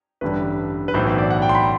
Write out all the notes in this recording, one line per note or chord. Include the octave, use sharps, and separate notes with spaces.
A1 G2 D3 G3 B4
B4
B1 A2 E3 C5
C5
D5
F#5
G5
C6
B5